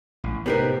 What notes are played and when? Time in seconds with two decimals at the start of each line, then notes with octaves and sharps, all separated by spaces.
0.24 A1
0.46 A2 C3 B3 D#4 G4 A#4 B4